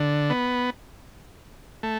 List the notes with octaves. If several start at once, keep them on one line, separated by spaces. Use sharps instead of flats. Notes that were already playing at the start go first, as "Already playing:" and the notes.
Already playing: D3
B3
A3